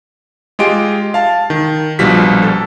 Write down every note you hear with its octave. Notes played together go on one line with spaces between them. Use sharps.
G#3 F4 G4 D#5 C6 D7
F5 A5
D#3
A#1 B2 F3 G3 B6
A4